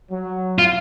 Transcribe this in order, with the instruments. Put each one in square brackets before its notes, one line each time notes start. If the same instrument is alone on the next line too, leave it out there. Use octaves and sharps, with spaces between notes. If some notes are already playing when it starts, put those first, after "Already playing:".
[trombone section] F#3
[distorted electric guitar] F4